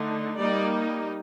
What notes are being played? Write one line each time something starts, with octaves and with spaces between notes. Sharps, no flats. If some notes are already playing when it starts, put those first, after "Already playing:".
Already playing: D3 A3 D#4
G3 A#3 D#4 D5